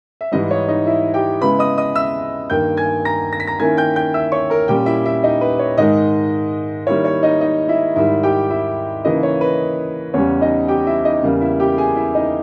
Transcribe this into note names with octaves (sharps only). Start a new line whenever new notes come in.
E5
G#2 E3 G3 D#4 D#5
C#5
D#4 D#5
E4 E5
G4 G5
C#3 G#3 B3 E4 B4 B5
D#5 D#6
D#5 D#6
E5 E6
G2 D#3 A#3 G5 G6
G#5 G#6
A#5 A#6
A#6
B6
A#5 A#6
D#3 A#3 C#4 E4 G#5 G#6
G5 G6
G5 G6
E5 E6
C#5 C#6
A#4 A#5
A#2 G3 C#4 G4 G5
E4 E5
E4 E5
D#4 D#5
B4
C#5
G#2 D#3 G#3 D#4 D#5
D#3 G3 A#3 E4 C#5
C#5
D#4 D#5
D#4 D#5
E4 E5
G#2 D#3 G3 E4 E5
G4 G5
E4 E5
C#3 E3 A#3 D#4 E4 D#5
C#5
B4
E2 C#3 G3 C#4 C#5
D#4 D#5
G4 G5
E4 E5
D#4 D#5
E2 C#3 G3 A#3
E4 E5
G4 G5
G#4 G#5
E4 E5
D#4 D#5